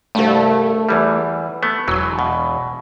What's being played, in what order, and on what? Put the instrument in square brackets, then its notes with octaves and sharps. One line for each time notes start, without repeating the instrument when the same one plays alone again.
[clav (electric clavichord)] C2 G2 [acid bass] A3
[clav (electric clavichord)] E2 E3 G3
A3 B3
[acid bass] E1 [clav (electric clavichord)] E3 F#3
[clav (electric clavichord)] B2